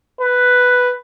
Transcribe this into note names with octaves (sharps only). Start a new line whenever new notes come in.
B4